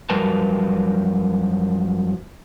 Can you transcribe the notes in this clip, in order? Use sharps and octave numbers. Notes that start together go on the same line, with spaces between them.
F#2 F3 G3 A#4 B4 A5